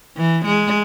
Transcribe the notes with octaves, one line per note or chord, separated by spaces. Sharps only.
E3
G#3